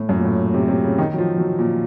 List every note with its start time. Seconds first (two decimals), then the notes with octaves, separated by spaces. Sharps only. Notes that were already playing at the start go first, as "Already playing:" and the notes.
Already playing: A2
0.09 F#2
0.17 A#2
0.24 A2
0.54 C3
0.68 C3
0.84 C#3
0.98 D#3
1.14 F#3
1.18 F3
1.38 F#3
1.59 A#2